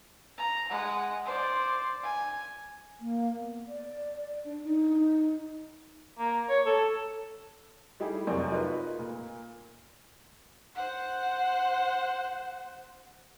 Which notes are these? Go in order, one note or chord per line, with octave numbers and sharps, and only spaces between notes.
A#5
G#3 F#5
C5 D5
G#5
A#3
B3
D5
D4
D#4
A#3
C#5
A4
G3 A3 D#4 E4 G4 G#4
F1 F#2 C4 A#4 D5 C#6
D#4 F4 G#4 A#4 B4
A#2
C5 F#5